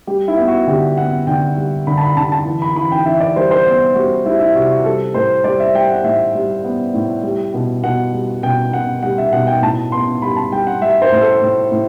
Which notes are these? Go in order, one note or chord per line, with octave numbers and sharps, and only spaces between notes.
G3 G4
E4
B3
F#4
D3 G4
B3 F#5
D3 G5
G3
D3 B5
A5
B5
D3 A5
A5
E3
B5
E3 B5
G5
E3 E5
D5
G3 C5
C5
B3
G3 F#4
G3 E4
E4
C3 F#4
F#4
G3 A4
A2 C5
G3 D5
E5
G3 G5
F#5
A2 E5
G3
B3
A2
G3
B2
B2 F#5
G3
B2 G5
B2 F#5
G3 F#5
E5
B2 F#5
G5
A2 A5
B3 C6
G3 B5
A5
G3 G5
F#5
G3 E5
C5
A2
A4
A2
A2